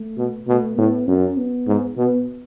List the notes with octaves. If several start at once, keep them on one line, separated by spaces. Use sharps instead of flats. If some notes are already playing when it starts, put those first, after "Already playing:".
Already playing: A3
B2
B2 A3
A2 B3
F#2 C#4
B3
G#2
B2 B3